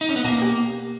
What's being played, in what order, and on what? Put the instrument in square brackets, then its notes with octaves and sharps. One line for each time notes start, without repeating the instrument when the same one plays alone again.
[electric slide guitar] D#4
C#4
B3
[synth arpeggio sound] B2 [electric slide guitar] A#3
[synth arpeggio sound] G4